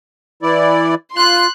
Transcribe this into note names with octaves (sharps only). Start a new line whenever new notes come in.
E3 E4 D5
F4 C6 F#6